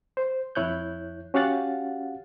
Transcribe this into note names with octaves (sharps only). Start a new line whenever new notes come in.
C5
F2 E4 C#5 F#6 G6
C#4 F#4 G4 F5 F#5 A6